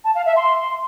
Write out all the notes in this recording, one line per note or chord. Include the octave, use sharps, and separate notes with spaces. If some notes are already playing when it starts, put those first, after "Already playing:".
A5
F5
E5
C6